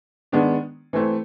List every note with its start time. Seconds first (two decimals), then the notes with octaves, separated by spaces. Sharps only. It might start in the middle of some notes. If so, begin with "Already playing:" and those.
0.32 D#3 G#3 B3 D4
0.93 E3 A3 C4